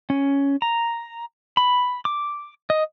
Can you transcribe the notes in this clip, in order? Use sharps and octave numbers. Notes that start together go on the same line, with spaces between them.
C#4
A#5
B5
D6
D#5